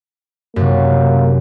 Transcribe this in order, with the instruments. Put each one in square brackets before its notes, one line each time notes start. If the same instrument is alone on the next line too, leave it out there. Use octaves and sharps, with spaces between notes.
[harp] F#2 C3 [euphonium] A#3